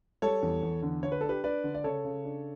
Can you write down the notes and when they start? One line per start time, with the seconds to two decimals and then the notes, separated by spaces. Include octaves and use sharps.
0.22 G3 A4 C#5
0.43 E2
0.63 E2
0.83 D3
1.03 D3 C#5
1.12 B4
1.21 D4 A4
1.29 G4 B4
1.44 D4 B4 D5
1.64 D3
1.74 D5
1.84 C#3 A4 C#5
2.05 C#3
2.25 D4